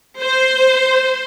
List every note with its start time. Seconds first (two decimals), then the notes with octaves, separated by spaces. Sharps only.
0.22 C5